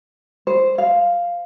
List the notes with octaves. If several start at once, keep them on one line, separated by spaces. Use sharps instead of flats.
C5
F5